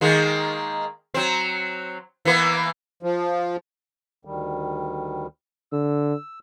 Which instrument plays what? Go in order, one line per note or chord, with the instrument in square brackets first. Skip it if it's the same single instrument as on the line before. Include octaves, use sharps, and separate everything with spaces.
[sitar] D#3 G#3 A#3
F#3 C4
E3 A#3 B3
[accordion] F3
D2 D#3 G3
[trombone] D3 [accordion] E6